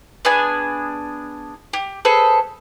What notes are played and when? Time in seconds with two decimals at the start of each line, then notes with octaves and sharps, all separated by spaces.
0.25 B3 D4 G#4 G#5
1.73 G4
2.05 G#4 A4 B4 C5